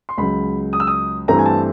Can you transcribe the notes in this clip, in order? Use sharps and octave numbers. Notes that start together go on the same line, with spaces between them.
C6
C#2 C#3 F#3 B5
D#6
E6
D#6
G2 E3 A3 C4 A#5
G#5
A5